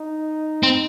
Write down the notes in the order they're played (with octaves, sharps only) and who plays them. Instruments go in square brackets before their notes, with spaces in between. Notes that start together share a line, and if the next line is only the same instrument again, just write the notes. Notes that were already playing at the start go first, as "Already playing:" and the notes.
Already playing: [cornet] D#4
[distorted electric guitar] C4